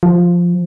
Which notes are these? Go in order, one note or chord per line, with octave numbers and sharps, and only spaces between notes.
F3